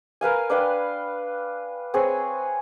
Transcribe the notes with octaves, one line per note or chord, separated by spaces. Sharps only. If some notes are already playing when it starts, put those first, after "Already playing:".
A#4 B4 F5 G#5
D4 B4 F5 G5
C4 G#4 B4 C#5